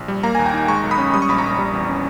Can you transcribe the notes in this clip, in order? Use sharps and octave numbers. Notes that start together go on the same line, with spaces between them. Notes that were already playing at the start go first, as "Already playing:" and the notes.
Already playing: A#1
G3
A#3 A#5
D#2 G#5
G5 A#5
D#4
G#3 A#5 C#6
B1
B5 D#6
C#4
G3 D#6
C#6
A#1 B5
A#5 C#6
A#1
G3
E2
C#4